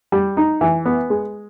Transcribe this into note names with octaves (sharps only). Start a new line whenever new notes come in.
G3
D#4
E3
B3
G#3